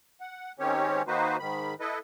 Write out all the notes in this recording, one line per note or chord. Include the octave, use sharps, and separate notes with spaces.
F#5
G#2 D#3 C4 C#4 G4 C#5
D#3 A#3 D#4 F#4 B4 C5
G#2 D#3 B5
E4 A4 B4 D#5